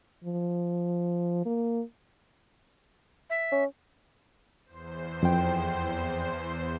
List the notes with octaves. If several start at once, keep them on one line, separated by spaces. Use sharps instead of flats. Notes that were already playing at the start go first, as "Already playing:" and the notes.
F3
A#3
E5
C#4
E2 C5
F2 G5